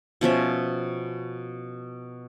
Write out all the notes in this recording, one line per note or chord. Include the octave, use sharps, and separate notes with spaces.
B2 F3 C#4 E5